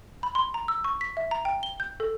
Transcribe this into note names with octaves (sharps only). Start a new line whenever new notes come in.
B5
C6
A#5
E6
C#6
B6
E5
A#5
G5
G7
G6
A4